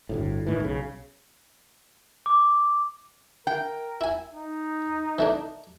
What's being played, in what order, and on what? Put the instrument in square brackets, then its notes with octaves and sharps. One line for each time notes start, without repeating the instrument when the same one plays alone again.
[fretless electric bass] G1 D2 A2
D2 A2 D#3 E3
B1 C#3
[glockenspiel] D6
[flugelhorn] A#4 [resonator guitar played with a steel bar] G5
[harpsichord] E4 G#5
[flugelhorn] D#4
[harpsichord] E3 A3 D4